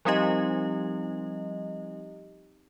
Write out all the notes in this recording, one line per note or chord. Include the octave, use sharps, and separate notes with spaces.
F3 G3 C4 D#4 G4 D#5